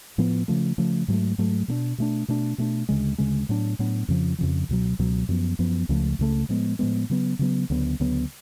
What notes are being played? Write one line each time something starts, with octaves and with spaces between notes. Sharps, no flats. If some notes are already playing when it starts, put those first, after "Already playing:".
A2 F3 B3
C#3 F3 A3
C#3 F3 A3
G#2 F#3 A3
G#2 F#3 A3
B2 A3 D4
B2 A3 D4
B2 A3 D4
B2 A3 D4
D2 C#3 G#3
D2 C#3 G#3
A2 F#3 B3 D4
A2 F#3 B3 D4
F2 C#3 F3
F2 C#3 F3
C#2 B2 F#3
C#2 B2 F#3
F#2 F3 B3
F#2 F3 B3
C#2 C#3 F3 A3
C#2 C#3 F3 A3
A2 F3 G#3 B3
A2 F3 G#3 B3
C#3 F#3 B3
C#3 F#3 B3
D2 C#3 F#3 B3
D2 C#3 F#3 B3